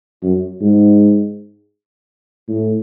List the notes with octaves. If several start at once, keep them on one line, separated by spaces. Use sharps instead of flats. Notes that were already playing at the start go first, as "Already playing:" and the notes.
F#2
G#2
A2